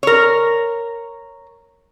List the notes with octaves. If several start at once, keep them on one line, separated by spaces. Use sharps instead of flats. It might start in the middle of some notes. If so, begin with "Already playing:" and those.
A#4 C#5